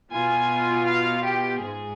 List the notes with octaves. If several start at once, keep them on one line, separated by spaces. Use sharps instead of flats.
B2 B3 F4 G#5
F5
G4
G#2 G#4